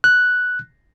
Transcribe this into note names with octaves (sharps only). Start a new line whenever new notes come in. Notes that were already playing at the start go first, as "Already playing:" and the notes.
F#6